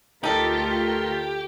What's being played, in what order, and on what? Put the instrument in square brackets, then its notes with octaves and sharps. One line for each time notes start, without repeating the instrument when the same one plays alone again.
[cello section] D2 A3 F4 [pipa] D#4 A4 [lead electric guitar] G4 [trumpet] A#4